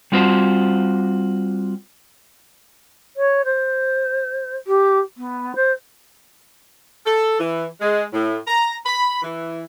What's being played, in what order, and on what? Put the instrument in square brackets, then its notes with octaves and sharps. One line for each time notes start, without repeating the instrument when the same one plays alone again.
[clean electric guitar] G3 C4 F4 F#4 C5
[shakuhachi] C#5
C5
G4
B3
C5
[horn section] A4
E3
G#3
A2
A#5
B5
E3